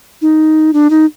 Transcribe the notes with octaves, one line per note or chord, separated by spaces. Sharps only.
D#4
D4
D#4